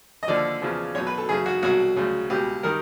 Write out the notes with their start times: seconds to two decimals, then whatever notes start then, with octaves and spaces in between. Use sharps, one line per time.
0.23 D#5
0.28 D#2 D3 F3 D5
0.62 E2 C#3 F3
0.95 B1 B2 F#3 C#5
1.07 B4
1.18 A4
1.29 F#2 C#3 F#3 G#4
1.46 F#4
1.63 C2 B2 F#3 F#4
1.96 D2 C#3 F#3
2.30 C#2 B2 G3 G4
2.63 D#3 G3 A#4